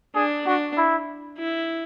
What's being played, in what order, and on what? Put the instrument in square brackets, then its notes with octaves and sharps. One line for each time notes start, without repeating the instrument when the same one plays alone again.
[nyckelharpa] D4 [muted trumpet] G#4
[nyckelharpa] D4 [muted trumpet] F#4
[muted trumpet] E4
[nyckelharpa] E4